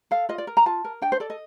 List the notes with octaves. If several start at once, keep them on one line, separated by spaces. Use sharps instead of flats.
A4 F5
F4 D#5
D5
A#4
A#5
F4 A5
A#4
D4 G5
C5
A4 D5
D#5